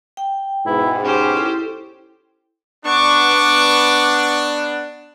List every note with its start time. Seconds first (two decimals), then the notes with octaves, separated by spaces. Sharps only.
0.17 G5
0.67 G#2 B2 B3 E4
1.04 C#4 G4 C5
1.36 E4 A4
2.85 B3 D4 C#6 D6